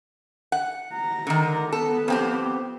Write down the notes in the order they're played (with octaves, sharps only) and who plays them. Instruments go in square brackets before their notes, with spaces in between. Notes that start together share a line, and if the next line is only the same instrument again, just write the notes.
[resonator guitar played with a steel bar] F#5
[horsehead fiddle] A#5
[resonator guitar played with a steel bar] D3 D#3
[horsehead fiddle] B3 [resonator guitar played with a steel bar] A4
[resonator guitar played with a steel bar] F2 C4 G4